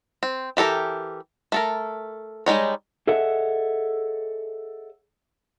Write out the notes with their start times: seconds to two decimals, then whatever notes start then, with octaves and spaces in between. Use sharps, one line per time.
0.23 C4
0.57 E3 G4 A4 A#4
1.52 A3 A4 A#4
2.46 G3 G#3 D#4 C#5
3.07 G#4 A4 C#5 D#5 E5 F#5